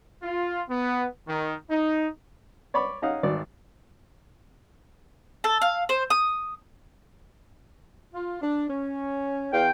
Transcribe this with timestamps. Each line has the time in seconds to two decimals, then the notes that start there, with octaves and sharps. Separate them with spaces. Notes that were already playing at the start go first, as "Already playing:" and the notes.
0.23 F4
0.69 B3
1.27 D#3
1.70 D#4
2.74 C#5 D5 B5 C#6 D6
3.02 C#4 D#4 D#5 F5 F#5
3.23 G#1 F#4 D5
5.44 A4
5.62 F5
5.89 C5
6.10 D#6
8.14 F4
8.41 D4
8.68 C#4
9.53 E2 F5 G5